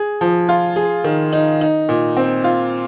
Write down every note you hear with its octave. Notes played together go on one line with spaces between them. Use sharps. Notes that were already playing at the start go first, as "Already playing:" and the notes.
Already playing: G#4
F3
F4
G#4
D#3
D#4
D#4
A#2
C4
F4